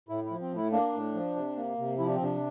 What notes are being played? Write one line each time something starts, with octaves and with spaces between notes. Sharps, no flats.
A2 E4
E4
F3
C4
A2 E4
A#3 D4
A2
F3
C3
A#3
C3
F3 E4
D4
C4
C3 D4